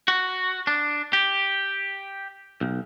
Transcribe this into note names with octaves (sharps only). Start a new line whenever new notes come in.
F#4
D4
G4
B1